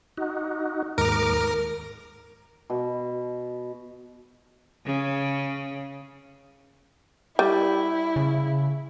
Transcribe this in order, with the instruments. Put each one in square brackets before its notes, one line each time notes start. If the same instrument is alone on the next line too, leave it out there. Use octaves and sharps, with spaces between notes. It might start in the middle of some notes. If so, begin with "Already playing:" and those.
[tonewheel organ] D#4 F#4
[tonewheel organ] D#2 G#2 D6 [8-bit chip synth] A#4
[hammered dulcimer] B2
[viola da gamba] C#3
[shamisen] G3 [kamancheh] E4
[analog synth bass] C#3